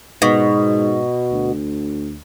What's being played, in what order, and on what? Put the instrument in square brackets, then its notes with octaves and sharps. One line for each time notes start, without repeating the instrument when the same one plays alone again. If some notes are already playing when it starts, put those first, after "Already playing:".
[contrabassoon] G#2 [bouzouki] B2
[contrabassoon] D2